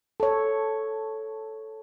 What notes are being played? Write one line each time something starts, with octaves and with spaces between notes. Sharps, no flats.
A4 C#5